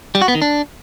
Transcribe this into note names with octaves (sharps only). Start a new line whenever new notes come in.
G3
F#4
B3
D#3
D4